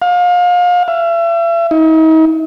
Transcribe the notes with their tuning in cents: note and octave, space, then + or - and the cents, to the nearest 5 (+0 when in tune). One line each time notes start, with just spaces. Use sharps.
F5 +30
E5 +40
D#4 +40